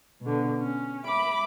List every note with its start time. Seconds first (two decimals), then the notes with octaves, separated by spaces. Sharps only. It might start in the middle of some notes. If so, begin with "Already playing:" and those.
0.21 B2 D3
0.58 C#4
1.06 E5 B5 D6